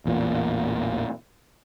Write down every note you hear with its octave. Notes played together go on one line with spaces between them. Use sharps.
A1 E2 A#2